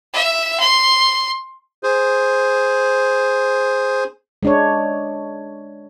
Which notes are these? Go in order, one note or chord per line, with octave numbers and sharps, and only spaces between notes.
E5
C6
G#4 C5
G#3 D4 C#5